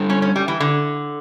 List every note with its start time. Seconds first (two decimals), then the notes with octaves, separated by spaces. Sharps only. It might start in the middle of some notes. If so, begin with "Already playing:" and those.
Already playing: G3 D4 A4
0.10 C#4
0.22 C#4
0.36 G3
0.48 E3
0.60 D3